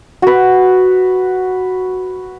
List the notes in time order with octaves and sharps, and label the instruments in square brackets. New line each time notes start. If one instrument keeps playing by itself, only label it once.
[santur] F#4 B4